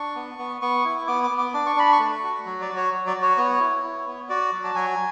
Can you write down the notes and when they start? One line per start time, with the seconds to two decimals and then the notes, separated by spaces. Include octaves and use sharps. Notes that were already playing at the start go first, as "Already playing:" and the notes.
Already playing: D4 C#6
0.15 B3
0.38 B3
0.61 B3 C#6
0.85 E4
1.07 B3 D6
1.23 D6
1.31 B3
1.38 D6
1.54 D4 D6
1.66 C#6
1.76 D4 B5
1.93 C#6
1.99 A3
2.23 F#4
2.46 F#3
2.61 D5
2.69 F#4
2.77 C#5
2.92 F#3
3.07 D5
3.15 F#4
3.22 C#5
3.37 B3 C#5
3.60 E4
3.83 E4
4.07 B3
4.29 F#4 D5
4.52 F#3
4.64 A5
4.75 F#3 G#5